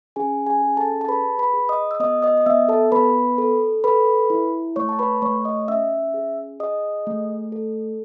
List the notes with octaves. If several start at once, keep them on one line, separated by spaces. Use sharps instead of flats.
C#4 G#4 G#5
G#4 G#5
G#4
A4 A5
A5
G#4 B4 B5
B4 B5
G#4
D#5 D#6
E6
B3 D#5 D#6
D#5 D#6
D#6
B3 E5 E6
A4 A5
B3 B4 B5
A4
A4 B4 B5
E4
A3 C#5 C#6
A5
B4 B5
A3 C#5 C#6
D#5 D#6
C#4 E5 E6
G#4
G#4 D#5 D#6
A3
A4